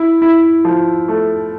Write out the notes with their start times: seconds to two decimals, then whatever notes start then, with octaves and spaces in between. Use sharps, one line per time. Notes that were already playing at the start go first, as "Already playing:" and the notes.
Already playing: E4
0.22 E4
0.65 F3
1.08 A3